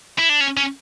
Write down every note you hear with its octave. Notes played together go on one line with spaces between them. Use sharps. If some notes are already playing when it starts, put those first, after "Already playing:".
E4
D4
C#4
C#4